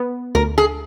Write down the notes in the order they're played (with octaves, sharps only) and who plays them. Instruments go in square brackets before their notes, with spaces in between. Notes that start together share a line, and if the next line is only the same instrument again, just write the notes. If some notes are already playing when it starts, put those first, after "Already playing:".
Already playing: [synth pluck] B3
[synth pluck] D2 [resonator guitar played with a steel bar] A#4
[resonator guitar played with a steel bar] G#4